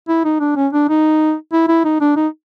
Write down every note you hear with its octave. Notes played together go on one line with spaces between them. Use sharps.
E4
D#4
D4
C#4
D4
D#4
E4
E4
D#4
D4
D#4